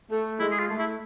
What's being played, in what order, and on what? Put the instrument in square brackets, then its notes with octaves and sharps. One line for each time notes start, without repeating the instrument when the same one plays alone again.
[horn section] A3
[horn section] G#3 [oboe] E4
[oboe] G#4
F4
[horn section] A3
[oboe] E4